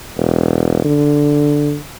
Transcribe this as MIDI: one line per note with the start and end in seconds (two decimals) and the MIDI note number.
0.17 0.82 28
0.85 1.77 50